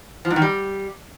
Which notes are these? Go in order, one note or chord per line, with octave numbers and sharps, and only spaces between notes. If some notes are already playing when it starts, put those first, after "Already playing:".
F3
G#2
D#3
G3